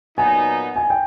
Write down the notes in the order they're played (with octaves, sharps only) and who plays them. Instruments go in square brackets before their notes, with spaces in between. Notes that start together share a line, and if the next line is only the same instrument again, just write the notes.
[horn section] A#2 F#3 B3 D#4 [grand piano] G#5
[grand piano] G#5
G5